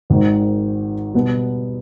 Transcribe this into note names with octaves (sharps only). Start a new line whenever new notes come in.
G#1 G#2 D#3
B2 G3 B3